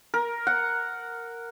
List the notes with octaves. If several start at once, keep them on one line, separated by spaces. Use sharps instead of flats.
A#4
F#5